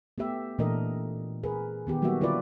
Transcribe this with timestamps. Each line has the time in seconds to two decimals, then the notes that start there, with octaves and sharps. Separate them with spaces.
0.18 A3 B3 G4 E5
0.58 A#2 E3 A3 D4 A#4 D#5
1.43 G#4 A#4 B4
1.87 D#3 B3 G4
2.02 F#3 G3 A#3 B3 F#4 E5
2.21 D3 E4 F4 A#4 B4 D5